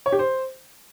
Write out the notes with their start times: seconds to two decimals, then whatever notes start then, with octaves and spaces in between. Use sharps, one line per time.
0.06 C#5
0.12 G4
0.19 C5